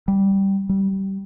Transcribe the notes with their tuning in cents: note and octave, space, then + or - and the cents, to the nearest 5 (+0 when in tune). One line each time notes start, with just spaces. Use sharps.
G3 -5
G3 -20